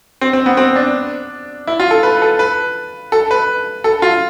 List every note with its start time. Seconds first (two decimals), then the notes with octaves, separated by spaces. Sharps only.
0.21 C4
0.33 C4
0.46 B3
0.57 C4
0.76 D4
1.67 E4
1.80 F4
1.91 A4
2.03 B4
2.22 A4
2.39 B4
3.12 A4
3.31 B4
3.84 A4
4.02 F4